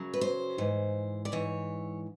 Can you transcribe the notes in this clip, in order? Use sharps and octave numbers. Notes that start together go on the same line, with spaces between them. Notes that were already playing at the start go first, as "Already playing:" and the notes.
Already playing: F#2 C#3 F#3
B4
C5
G#2 E3
D5
G#2 E3 C#5